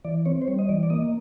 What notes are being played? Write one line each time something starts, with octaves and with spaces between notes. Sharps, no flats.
E3 D5
C4 C#5
C5
G3 C#5
D#5
E3 D5
D5
A#3 D#5